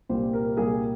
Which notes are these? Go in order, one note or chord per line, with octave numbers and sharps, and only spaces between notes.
C2 A#2 G3 A#3 C5
A#4
C2 A#2 G3 A#3 G#4